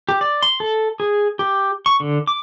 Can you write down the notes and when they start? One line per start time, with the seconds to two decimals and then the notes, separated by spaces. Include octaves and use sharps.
0.09 G4
0.21 D5
0.43 C6
0.60 A4
1.00 G#4
1.39 G4
1.86 C#6
2.00 D3
2.27 D6